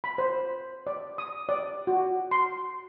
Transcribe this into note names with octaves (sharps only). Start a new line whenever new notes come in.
B5
C5
D5
D#6
D5
F#4
C6